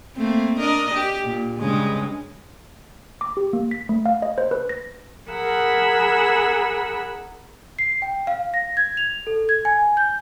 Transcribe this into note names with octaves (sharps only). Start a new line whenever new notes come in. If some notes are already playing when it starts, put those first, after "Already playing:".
A3 A#3 C4
D4 A#4 D#5
G4
A#2
G2 C#3 G#3
D6
G4
A#3
B6
A3
F5
D#5
C5
B4
A#6
G#4 A#4 F#5 B5 E6
C7
G5
F5
A#6
G#6
F7
A4
G#6
G#5
G6